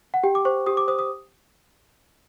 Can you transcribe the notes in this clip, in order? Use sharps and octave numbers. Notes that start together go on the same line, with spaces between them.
F#5
G4 G5
D6
C5 C#6
G4 D#6
D6
C5 D#6
D#6